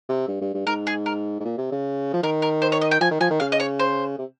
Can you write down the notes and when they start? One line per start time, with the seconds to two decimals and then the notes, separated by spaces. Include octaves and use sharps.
0.09 C3
0.28 G2
0.41 G2
0.54 G2
0.66 G#2 A#4
0.87 G#4
1.06 A#4
1.40 G#2
1.45 A#2
1.57 C3
1.72 C#3
2.14 F3
2.23 D#3 A#4
2.42 A#4
2.62 C5
2.72 C#5
2.81 D#5
2.91 G5
3.01 F3 G#5
3.11 D#3
3.20 F3 G#5
3.30 D#3
3.40 C#3 F5
3.52 D#5
3.60 C#5
3.79 C5
4.18 C3